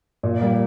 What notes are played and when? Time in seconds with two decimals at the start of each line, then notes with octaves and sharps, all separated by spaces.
0.23 A#2
0.41 G3 A#3